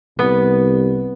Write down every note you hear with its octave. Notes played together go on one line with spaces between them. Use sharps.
C2 B3